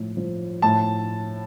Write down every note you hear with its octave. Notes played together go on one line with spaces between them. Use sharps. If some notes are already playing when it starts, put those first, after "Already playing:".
Already playing: A2 F3
F3
A2 A5